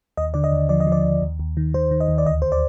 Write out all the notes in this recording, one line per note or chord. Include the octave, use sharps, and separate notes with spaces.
D#2 D#5
D3 D5
D#5
D#2
F3 D5
D#5
F3
D5
D#2
D#2
D#2
D#3
D#3 C5
D#3
D#5
D#2
D5
D2 D#5
D2 C5
D5